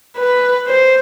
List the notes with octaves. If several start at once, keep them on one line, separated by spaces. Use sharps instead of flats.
B4
C5